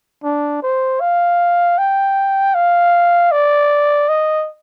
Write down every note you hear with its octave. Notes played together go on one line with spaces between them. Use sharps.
D4
C5
F5
G5
F5
D5
D#5